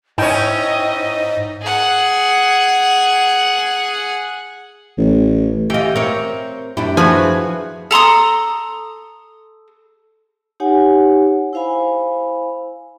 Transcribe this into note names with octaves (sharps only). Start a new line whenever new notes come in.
G#2 C#4 E4 D#5 G5
G#4 F#5
A1
E3 F4 G4 D#5
C4 A#4 C#5
F#2 D4 E4 G4
F3 F#4 G#4 B4 G#5
A4 A#5 C6 D#6
D#4 G4 C#5 F#5 G#5
E4 C5 F5 G#5 B5